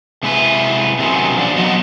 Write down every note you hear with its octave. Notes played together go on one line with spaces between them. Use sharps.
C3 G#3 E4 B4
C3 D#3 F#3 C4 C#4
F3 D4 D5
F#3 B3 D#5